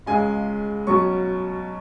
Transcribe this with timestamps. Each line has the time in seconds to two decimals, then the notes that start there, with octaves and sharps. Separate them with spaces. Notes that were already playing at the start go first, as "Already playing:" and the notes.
0.06 C#2 C#3 G#3 G#5
0.86 B2 F#3 C#4 C#6